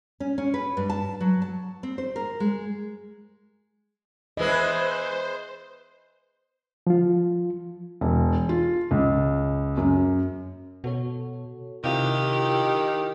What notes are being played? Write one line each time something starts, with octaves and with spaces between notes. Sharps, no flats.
C#4
C#4
B4
G2
A5
F#3
A5
C4
C5
A#4
G#3
E3 G#3 E4 B4 C5 D#5
F3 F4
E1
F4
C#2
F#2
B2 F#4 A4 C#5
C3 D#3 E4 F4 G4 F5